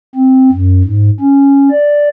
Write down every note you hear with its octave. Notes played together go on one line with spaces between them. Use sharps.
C4
F#2
G#2
C#4
D5